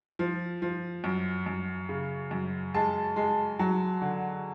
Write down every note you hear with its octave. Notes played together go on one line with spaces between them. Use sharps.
F3
F3
F#2
F#2
C#3
F#2
G#3 A5
G#3
F#3
D3